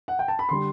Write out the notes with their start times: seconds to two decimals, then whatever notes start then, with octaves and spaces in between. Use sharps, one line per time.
0.08 F#5
0.19 G5
0.28 A5
0.39 B5
0.49 D3 G3 C6